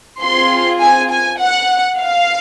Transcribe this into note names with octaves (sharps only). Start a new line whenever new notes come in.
C4 F4 G#4 C6
G#5
G#5
F#5
F5